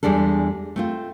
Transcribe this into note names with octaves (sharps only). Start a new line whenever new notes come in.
E2 G3 G#3 D4 A4
A3 C4 F4